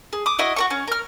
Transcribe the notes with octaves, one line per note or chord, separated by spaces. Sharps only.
G#4
D6 D#6
E4 F#4 D#5
F#4 A#4 C#6
C#4
A#4 F6